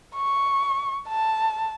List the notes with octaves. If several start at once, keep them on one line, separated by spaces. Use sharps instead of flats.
C#6
A5